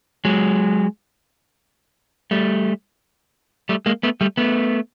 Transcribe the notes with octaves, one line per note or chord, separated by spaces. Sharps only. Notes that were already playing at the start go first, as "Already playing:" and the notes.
F#3 G#3
G3 A3
G3 A3
G#3 A#3
A3 B3
G3 A3
A3 B3